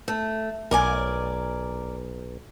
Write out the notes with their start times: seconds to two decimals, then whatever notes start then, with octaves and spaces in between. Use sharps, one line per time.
0.08 A3
0.71 B1 A#4 D5 G#5